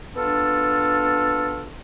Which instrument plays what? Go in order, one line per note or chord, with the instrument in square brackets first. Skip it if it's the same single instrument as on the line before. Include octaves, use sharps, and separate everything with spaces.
[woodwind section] B3 D4 F4 A4